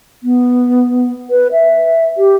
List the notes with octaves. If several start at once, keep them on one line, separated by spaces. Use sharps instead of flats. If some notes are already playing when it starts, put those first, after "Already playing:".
B3
B4
E5
G4